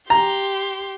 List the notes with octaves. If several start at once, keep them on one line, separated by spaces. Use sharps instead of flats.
G4 A#5 C6